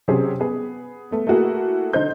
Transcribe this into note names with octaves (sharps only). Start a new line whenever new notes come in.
C3 F#3 C4 C#4 G#4
B3 G#4
A3 B3
A3 A#3 E4 F#4 G#4
D3 D#4 C5 G6